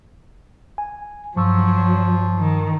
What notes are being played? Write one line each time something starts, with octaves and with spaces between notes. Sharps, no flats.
G#5
G2 F3 F#3 C#6 E6
D#3